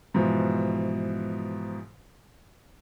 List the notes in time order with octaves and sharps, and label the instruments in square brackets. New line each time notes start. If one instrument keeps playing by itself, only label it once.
[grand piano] G#2 B2 E3 F3